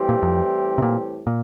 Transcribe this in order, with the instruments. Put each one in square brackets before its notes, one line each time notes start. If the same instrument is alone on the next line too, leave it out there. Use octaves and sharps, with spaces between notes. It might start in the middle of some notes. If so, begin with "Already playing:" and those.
Already playing: [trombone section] A2 E3 G3 C4 G4
[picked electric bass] A#2
F2
C3
A#2
A#2